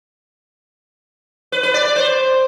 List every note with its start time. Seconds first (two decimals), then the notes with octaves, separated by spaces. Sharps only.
1.52 B4
1.63 B4
1.74 D5
1.85 D5
1.96 C5